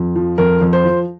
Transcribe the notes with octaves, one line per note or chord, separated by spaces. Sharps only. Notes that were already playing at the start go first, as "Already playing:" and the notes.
Already playing: F2
F3
F2 A#4
F2
C5
F3